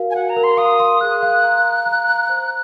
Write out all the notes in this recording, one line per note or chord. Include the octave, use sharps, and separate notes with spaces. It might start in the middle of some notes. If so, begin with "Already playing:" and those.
Already playing: F#4 A#4 F5
G#5
F5 F#5
A#5
A#4
C6
F5 D#6
C6
G#4 F#6
F5
A#5
A#5
A#5
A#5
C5